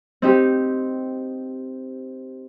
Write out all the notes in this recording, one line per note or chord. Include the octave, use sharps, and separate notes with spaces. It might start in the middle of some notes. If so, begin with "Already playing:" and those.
C4 D#4 G4